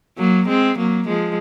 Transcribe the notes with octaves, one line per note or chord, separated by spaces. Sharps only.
F#3 A#3
G#3 C4
F#3 A#3
F3 G#3